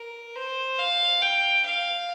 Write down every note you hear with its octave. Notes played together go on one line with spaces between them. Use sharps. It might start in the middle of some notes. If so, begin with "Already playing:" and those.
Already playing: A#4
C5
F5
G5
F5